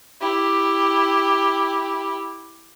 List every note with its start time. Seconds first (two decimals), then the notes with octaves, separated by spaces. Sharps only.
0.21 E4 G4